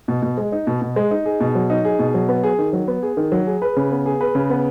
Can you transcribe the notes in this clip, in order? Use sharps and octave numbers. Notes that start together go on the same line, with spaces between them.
B2
B2
G#3
D#4
B2
B2
G#3
D#4
G#4
B2
F#3
D#4
G#4
B2
F#3
B3
G#4
D#3
F#3
B3
G#4
D#3
F#3
G#4
B4
C#3
B3
G#4
B4
C#3
B3